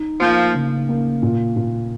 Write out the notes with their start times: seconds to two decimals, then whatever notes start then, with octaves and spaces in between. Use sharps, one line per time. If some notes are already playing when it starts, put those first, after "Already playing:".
Already playing: D#4
0.20 F3 A#3
0.54 C#3
0.89 A#3
1.22 A#2
1.56 A#2